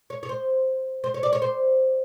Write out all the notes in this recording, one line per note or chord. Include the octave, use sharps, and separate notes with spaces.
C#5
C#5
C5
C5
C#5
D5
C#5
C5